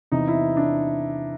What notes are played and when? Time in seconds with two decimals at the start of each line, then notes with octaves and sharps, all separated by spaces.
0.12 E2 C3 E3 D#4
0.27 E4
0.57 D4